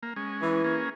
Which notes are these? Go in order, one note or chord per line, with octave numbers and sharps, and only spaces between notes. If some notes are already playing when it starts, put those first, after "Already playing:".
A#3
G#3 C#4
E3
A#3 C#4 G#4